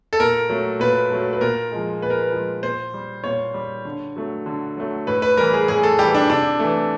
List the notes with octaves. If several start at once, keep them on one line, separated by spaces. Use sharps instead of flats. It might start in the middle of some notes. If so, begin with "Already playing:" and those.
A4
A#2 A#4
F#3 A3
A#2 B4
F#3 A3
B4
A#2 A#4
F3 G#3
A#2 B4
A#4
B4
F3 G#3
A#2 C5
G3
A#2 C#5
G3
D3
F#3 A3
D3
F#3 A3
A2 B4
B4
E3 G3 A#4
G#4
A2 G#4
A4
E3 G3 G4
D4
C3 D4
E3 A3